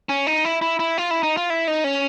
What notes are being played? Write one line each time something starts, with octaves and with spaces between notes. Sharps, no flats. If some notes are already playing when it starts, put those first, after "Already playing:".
C#4
D#4
E4
E4
E4
F4
E4
D#4
F4
E4
D#4
C#4